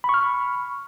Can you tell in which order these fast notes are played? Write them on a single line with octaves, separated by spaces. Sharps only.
B5 C#6 F6